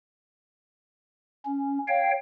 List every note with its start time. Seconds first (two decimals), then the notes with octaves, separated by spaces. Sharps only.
1.46 C#4
1.88 C#5 F5 G5